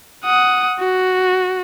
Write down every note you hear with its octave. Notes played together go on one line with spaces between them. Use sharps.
F#5 D#6
F#4